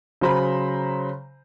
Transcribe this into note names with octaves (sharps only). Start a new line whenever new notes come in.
C#3 F#3 C5 A#5 B5